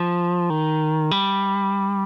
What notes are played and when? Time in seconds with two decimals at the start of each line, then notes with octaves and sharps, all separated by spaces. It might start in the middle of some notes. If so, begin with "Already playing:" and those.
Already playing: F3
0.50 D#3
1.11 G3